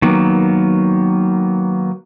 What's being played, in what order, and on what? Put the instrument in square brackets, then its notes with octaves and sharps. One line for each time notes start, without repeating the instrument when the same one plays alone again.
[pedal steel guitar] D#3 F#3 A#3 B3